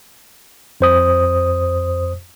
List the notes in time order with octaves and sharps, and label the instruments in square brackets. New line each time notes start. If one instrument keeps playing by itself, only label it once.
[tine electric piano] F2 C5 D#6